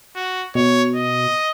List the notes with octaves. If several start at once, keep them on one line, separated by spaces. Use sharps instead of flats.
F#4
B2 C#5
D#5